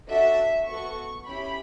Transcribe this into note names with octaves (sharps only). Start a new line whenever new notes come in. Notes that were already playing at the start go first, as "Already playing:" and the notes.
D4 F#4 A4 E5
B3 F#4 A4 C#6
C#4 E4 G4 B5